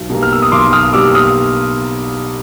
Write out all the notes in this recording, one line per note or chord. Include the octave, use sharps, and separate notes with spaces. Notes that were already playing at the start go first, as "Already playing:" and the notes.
Already playing: B1
B2 G3 A#3
F6
E6
D#6
B1 C6 D6
D#6 F6
B2 G3 A#3 D6 E6
D#6 F6